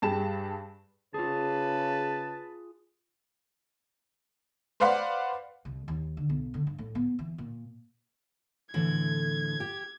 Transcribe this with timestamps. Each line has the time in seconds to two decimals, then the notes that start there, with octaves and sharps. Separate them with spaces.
0.02 G2 G3 G4 G#4 A5 E7
1.14 C#3 F4 G#4 B4 A5
4.80 B4 C5 D5 F5 F#5 B5
5.65 C2
5.88 D#2
6.17 D3
6.29 B1
6.54 D3
6.67 G2
6.78 A2
6.95 B3
7.19 E3
7.38 A#2
8.74 A2 D3 E3 G#6
9.60 G4